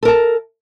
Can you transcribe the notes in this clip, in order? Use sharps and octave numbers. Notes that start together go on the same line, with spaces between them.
A4 A#4 A5